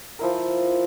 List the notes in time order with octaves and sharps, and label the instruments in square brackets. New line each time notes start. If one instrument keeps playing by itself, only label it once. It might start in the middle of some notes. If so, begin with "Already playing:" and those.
[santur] F3 E4 A#4